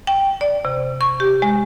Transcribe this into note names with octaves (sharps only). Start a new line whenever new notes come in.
G5
D5
C3
C#6
G4
G#3